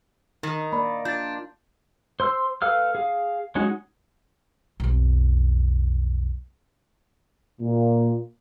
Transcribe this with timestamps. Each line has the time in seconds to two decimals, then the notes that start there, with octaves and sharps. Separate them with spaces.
0.43 D#3 D#4
0.72 A#3 D5 B5
1.05 D4 F4 G6 A6
2.20 C5 C6 E6
2.62 A4 B4 F5 E6 F6
2.95 G#4 F5
3.55 F#3 G#3 C#4 D#4 F#4
4.80 B1 F2
7.61 A#2